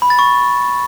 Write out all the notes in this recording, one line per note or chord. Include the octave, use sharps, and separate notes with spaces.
B5
A6
C#6